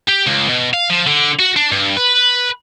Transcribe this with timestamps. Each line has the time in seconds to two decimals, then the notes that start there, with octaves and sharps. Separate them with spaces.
0.09 G4
0.27 C#2
0.49 B2
0.74 F5
0.90 F3
1.07 D3
1.39 F#4
1.56 D4
1.72 G2
1.97 B4